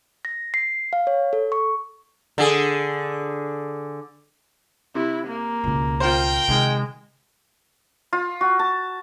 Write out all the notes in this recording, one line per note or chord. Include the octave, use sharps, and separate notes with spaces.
A#6
C7
F5
C#5
A4
C#6
D3 G#4
C3 E4
A#3
C#2 B2
F4 A#4 C5 F5 G5
C3 D#3 G#3
F4
F#4
A5